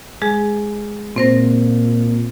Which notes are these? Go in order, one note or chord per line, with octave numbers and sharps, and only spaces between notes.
G#3 G#4
A#2 C4 C5 A#6